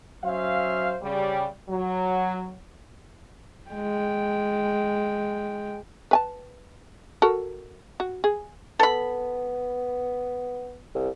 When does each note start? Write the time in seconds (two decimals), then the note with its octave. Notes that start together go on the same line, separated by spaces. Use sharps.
0.24 F#3 C#4 C5 E5 F5
1.02 C#3 G3
1.69 F#3
3.70 G#3 G5
6.11 B4 G#5 A5
7.22 F#4 A4 A#4
8.00 F#4
8.24 G#4
8.79 B3 A4 B5
10.95 C2